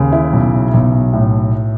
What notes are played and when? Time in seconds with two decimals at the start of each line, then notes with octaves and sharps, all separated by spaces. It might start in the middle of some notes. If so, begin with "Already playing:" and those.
Already playing: D#2 C#3
0.13 E4
0.33 B1
0.74 B1
1.13 A2